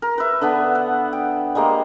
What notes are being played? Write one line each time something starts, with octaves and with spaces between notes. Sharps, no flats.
A#4
B4 E5
D3 B3 D4
F#5
G5
G3 G#3 A#3 C5